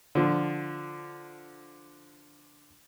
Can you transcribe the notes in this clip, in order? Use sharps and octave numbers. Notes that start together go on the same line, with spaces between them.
D3 F3